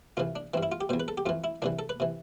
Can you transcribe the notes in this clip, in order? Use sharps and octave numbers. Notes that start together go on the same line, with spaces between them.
C2 C3 E3 F4
D4
G2 E3 C4
E4
F4
G4
E2 B2 C5
B4
A4
G4
F2 E3 F4
E4
C2 C3 E3 D4
A4
B4
C3 E3